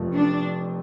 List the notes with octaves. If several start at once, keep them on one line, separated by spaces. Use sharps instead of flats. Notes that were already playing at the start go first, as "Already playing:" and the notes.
Already playing: F1 F2 F3 A3 F4
D4